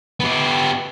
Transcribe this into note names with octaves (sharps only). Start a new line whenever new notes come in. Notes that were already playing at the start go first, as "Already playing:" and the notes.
B3 G4